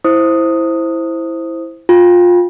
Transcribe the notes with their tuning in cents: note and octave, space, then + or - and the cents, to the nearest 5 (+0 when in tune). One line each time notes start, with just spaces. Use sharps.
E4 +0 C5 +0 D#6 +0
F4 +20 G5 +25